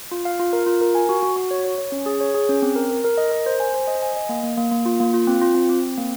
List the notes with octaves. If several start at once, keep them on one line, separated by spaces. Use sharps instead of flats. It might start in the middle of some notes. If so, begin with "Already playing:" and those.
F4
F5
F4
A#4
F4
A#4
G#5
F#4
F#4
F#4
C#5
C#5
C#5
C#4
G#4
C#5
G#4
C#4
C4
A#4
A#4
A#4
D#5
A#4
C5
G#5
C5
D#5
G#5
D#5
A#3
A#3
A#3
A#3
F4
A#3
F4
C4
F4
C4
C4
C4
A#3